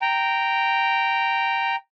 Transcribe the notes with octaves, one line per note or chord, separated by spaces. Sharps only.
G5 A#5